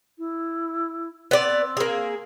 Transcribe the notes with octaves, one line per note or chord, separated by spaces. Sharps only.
E4
B3 C4 D5
A#3 G#4